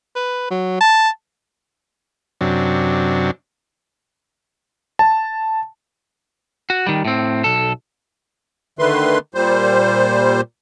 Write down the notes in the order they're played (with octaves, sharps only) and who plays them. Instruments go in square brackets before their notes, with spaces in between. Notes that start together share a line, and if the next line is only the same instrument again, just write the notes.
[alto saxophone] B4
F#3
A5
[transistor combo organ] F#2 C3 F#3 D4
[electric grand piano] A5
[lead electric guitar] F#4
D#3 G3
A2 C4
B1 A4
[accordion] D3 D#3 A3 B4 C6
A#2 G3 C5